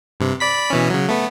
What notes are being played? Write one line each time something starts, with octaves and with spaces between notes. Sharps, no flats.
G2 C3
D5 B5 B6
B2 E3 C#4
C#3 F#3
A3 B3